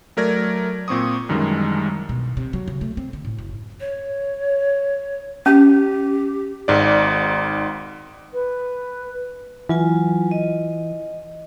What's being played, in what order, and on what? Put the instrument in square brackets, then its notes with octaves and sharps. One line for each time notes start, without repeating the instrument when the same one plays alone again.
[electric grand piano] F#3 A3 A#4 D5 G#6 A#6
A#2 C4 C#6 D#6
C2 F#2 D#3 E3 G3 G#3
[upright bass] B2
C3
F#3
C#3
A3
C4
D3
A2
F#1
[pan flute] C#5
[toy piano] C#4 [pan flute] G4
[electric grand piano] G#1 G#2 D5
[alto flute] B4
[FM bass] E3 [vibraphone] F#3 F4 G#5
[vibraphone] D#5